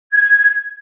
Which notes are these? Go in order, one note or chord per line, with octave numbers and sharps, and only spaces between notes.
G#6